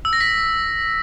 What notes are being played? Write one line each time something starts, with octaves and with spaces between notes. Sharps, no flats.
E6
A#6
B6